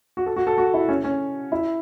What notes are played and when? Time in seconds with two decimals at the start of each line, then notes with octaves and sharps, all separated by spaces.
0.17 F#4
0.26 A4
0.36 F#4
0.47 A4
0.58 F#4
0.74 E4
0.88 C#4
1.04 C#4
1.52 E4